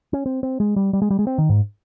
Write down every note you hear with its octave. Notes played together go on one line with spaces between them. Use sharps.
C#4
C4
C4
G#3
G3
G3
G#3
G3
G#3
C4
D#3
G#2